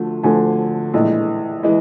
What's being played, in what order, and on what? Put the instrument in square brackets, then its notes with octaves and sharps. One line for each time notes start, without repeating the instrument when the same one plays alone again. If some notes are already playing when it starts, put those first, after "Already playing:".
Already playing: [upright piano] D2 D3 F3 A3
D2 D3 F3 A3 G#5
A#1 A2 E3 G#3
E3 G#3